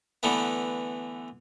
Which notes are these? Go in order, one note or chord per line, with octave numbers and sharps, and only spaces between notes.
D3 E3 A3 B3